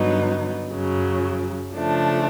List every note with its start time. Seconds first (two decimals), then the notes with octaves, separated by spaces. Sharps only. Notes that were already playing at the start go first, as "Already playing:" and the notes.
Already playing: G2 D3 F#3 B3 D#4
0.71 F#2 C#3 F#3
1.73 C#3 F3 A3 D4